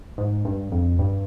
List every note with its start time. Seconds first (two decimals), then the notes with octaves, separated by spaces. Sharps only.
0.18 G#2
0.45 G2
0.72 F2
0.99 G2